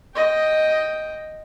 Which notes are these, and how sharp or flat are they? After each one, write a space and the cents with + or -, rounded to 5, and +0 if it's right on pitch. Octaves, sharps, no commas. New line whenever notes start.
D#5 +0 G5 +0